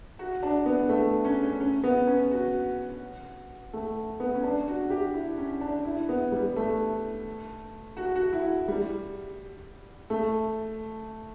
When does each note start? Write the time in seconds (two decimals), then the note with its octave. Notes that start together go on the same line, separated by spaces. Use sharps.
0.19 F#4
0.43 D4
0.66 B3
0.89 A3
1.25 C#4
1.43 C#4
1.60 C#4
1.83 B3
2.07 C#4
2.31 F#4
3.73 A3
4.20 B3
4.35 C#4
4.43 D4
4.68 F#4
4.90 G4
5.14 E4
5.38 C#4
5.61 D4
5.85 E4
6.09 B3
6.32 G3
6.56 A3
7.97 F#4
8.15 F#4
8.33 E4
8.68 G3
10.10 A3